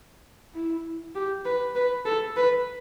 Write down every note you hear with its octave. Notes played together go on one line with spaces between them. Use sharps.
E4
G4
B4
B4
A4
B4